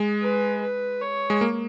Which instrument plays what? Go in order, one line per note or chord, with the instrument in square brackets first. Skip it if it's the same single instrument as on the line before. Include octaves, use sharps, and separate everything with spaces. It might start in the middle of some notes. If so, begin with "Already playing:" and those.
Already playing: [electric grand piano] G#3
[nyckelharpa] B4
B4
C#5
[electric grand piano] G#3
A#3